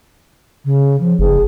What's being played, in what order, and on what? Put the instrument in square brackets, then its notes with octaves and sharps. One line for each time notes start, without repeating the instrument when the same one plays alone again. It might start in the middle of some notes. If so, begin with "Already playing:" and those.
[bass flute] C#3
F3
[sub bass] F#1 [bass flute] G#4